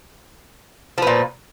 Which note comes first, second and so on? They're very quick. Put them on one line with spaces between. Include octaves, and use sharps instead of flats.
F3 B3 A#2